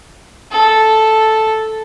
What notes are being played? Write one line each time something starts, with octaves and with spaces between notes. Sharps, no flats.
A4